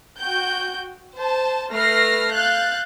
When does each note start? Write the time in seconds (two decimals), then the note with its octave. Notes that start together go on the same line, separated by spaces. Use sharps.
0.19 F#4 G5 G6
1.15 C5 A5
1.72 A3 B4 F6 A#6 C7
2.33 F5 F#6 G6 A6